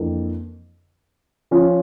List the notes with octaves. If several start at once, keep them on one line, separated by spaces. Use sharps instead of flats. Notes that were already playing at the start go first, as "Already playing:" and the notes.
Already playing: F2 E3 A#3 D4 A4
F3 C#4 F4